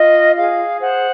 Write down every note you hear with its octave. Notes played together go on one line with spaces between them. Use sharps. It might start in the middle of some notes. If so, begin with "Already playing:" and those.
Already playing: F4 D#5
G#4 F5
C5 F#5